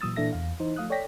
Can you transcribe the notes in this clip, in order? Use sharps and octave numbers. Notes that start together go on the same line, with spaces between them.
A#2 E3 F#3 D#6 E6 A6
A#2 E3 D4 A4 E5 A#6
E2 F5
E3 D#4 C5
F3 A3 F5 D#6 F#6
A4 C#5 D5 G5 A#6 B6